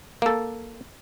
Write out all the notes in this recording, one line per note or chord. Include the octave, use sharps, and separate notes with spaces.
A#3 A4